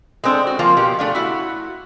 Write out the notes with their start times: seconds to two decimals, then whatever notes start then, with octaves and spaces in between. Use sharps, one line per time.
0.24 G#3 B3 C4 D4 A4
0.47 F#4
0.59 F3 A#3 F4
0.77 B2 G4
0.99 A3 D4 F5
1.15 E4 F#4